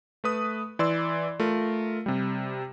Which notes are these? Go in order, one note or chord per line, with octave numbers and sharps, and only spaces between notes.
A3 B4 D#6
E3 D5 C6 E6
A3 F4 A#4
C3 G3